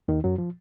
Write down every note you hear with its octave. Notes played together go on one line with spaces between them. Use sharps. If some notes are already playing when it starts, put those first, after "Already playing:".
D#2 D#3
F#2 F#3
F3